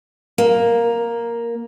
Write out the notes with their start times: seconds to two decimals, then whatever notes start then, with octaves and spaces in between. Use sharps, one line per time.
0.38 A#3